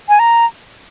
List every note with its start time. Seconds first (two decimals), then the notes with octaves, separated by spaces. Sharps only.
0.09 G#5
0.19 A#5